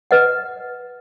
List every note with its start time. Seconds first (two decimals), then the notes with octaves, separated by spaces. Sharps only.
0.11 B4 D#5 F#5